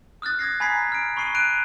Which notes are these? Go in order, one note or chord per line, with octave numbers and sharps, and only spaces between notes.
D#6 F6 F#6 A6
D#6 G#6 A#6 C7
G#5 A#5 B5 G#6 B6 C7
F6 D7
B5 C#6 D#6 C7 D#7 G7
F#6 D7 D#7 F7